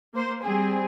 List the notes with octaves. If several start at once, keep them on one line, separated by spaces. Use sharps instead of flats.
A#3 C5
G3 C4 G#4